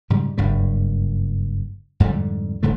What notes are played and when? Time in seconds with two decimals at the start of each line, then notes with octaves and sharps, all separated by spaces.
0.10 G#2 C#3 G3
0.38 F#1 G2 G3
2.00 F2 G#2 D3 G3
2.63 D#1 G#2 D3 A3